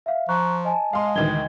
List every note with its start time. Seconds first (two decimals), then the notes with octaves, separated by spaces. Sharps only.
0.06 E5 F5
0.29 F3 A#5 C#6 F#6
0.65 D#5 G#5 A5
0.93 G#3 F5 C6
1.15 D2 D#3 E3 D#5 G#6 G7